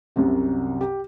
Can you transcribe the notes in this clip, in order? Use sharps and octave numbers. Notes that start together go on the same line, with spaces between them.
C2 F#2 C3
G4